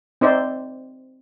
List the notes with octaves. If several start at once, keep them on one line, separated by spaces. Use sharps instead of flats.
C4 D#4 C5 D5 E5